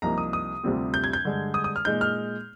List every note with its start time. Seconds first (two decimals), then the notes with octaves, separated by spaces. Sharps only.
0.02 C2 C3 F3 A#3 D#4 A#5
0.18 D#6
0.33 D#6
0.64 D2 C3 G3 C4 F4
0.94 G6
1.04 G#6
1.13 G6
1.25 G2 D3 G#3
1.54 D#6
1.64 D#6
1.76 F6
1.85 A#2 G#3 D#4 G6
2.01 F6